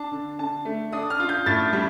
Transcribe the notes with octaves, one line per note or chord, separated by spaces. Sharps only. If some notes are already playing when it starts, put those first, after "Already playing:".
Already playing: D4 A5
D3
D3 A5
A3
D4 D#6
F6
F4
G6
A2 A6
G3